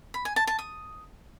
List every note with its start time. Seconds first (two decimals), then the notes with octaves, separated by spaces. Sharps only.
0.14 B5
0.25 G#5
0.36 A5
0.47 A5
0.59 D#6